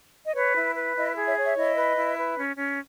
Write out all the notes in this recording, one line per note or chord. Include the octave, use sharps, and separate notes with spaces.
D#5
B4 C#5
E4
B4
E4 D#5
G#4
C#5 E5
C#5
E5
E4 D#5
B4
E4
B4
C#4
C#4